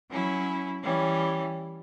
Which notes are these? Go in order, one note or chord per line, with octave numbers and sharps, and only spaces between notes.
F#3 C#4 E4
E3 G3 C#4